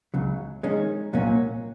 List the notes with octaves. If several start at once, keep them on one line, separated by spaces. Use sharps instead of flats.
C#2 C#3 F#3
D#3 G#3 C#4
C2 A#2 F#3 A#3 C#4